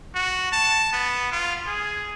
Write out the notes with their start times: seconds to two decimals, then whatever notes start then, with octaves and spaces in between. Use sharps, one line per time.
0.15 F#4
0.52 A5
0.93 B3
1.32 F4
1.67 G#4